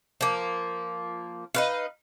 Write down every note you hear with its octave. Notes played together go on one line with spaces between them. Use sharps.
F3 A#3
D#4 B4 F5